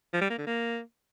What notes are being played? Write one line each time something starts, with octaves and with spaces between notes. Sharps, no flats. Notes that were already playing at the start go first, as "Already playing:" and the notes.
F3
G3
A#3
D3
A#3